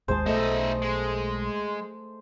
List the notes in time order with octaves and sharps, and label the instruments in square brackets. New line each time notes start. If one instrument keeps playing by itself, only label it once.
[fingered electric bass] G#1 D#2 G#3 [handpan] G#4 [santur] C5 A5
[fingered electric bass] B1 [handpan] A3 A4 D#5 [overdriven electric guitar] D#4 E5
[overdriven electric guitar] G#3